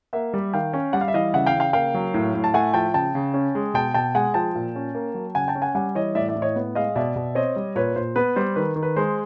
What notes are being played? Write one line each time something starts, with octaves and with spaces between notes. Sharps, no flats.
A#3 E5 F#5
G3
D#3 F5 G5
C#4
G3 F#5
F5
E5
E3 D#5 F5
C#3 E5 F#5
F5 G5
C#3
F5 G5
A#3 F5 G5
F#3
A2
A2
A5
A3 F#5 G#5
F3 G5 A5
C#3 G5 A5
C#3
C#4
G#3
B2 G5 A5
B2 G5 A5
G#3 F#5 G#5
F3 G5 A5
A#2
C#4
A#3
F#3
C#3 F#5 G#5
G5 A5
C#4
F#5 G#5
G3 F#5 G#5
E3 C#5 D#5
A2 D5 E5
D5 E5
A2
C#5 D#5
B3
G#3 D#5 F5
B2 D5 E5
B2
C4 C#5 D#5
G3
A#2 B4 C#5
A#2 C5
B3 B4
G3 C5
D#3 B4
D#3
B4
G#3 C5